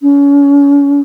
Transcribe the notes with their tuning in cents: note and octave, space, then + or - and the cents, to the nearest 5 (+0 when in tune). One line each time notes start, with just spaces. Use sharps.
C#4 +35